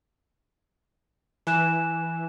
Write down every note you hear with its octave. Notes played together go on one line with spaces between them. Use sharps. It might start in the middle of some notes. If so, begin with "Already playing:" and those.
E3 G#5 F#6 E7